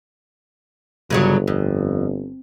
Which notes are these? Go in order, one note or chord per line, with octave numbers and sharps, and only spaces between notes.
G1 G2 C#3 F#3
F2